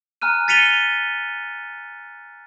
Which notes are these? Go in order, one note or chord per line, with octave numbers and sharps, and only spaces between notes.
G#5 A#5 F6 F#6 D#7
A6 B6 C#7 D#7 F7 G7